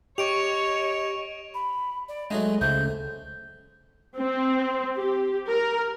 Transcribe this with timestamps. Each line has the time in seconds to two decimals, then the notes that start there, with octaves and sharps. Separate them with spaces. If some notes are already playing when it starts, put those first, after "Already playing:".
0.18 G4 C#5 D#5 C#6 D7 F7
1.54 B5
2.09 D5
2.30 F#3 G#3 A3 D#4 D#5
2.61 C#2 A3 C5 G6
4.20 C4
4.98 G4
5.50 A#4